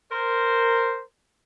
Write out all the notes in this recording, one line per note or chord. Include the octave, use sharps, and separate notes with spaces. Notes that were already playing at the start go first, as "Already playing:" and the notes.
A#4 C5